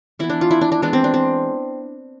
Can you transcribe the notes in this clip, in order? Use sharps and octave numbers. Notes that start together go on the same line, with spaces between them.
E3 B3 E4
D4
F4
E4
D4
D4
E3 G#3 B3 D4
C4
D4
C4